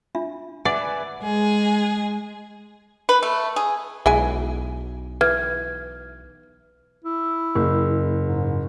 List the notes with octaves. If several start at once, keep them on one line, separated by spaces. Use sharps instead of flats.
D4 F4 E5
B4 D5 E5 F#5 G#5
G#3 G#4
B4
A3
G#4
B1 G#3 E4 G#5
E3 B4 F6 G#6
E4
F#1
G#2